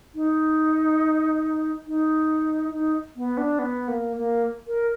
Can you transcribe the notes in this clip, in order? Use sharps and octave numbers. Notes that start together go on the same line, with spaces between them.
D#4
D#4
D#4
B3
D4
B3
A#3
A#3
A#4